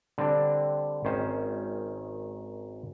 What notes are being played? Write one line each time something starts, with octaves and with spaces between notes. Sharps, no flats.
D3 G3 C4 D4
G#1 D#3 C#4 C5